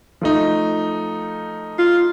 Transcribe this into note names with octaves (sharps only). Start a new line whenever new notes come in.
F3 A3 D#4
F4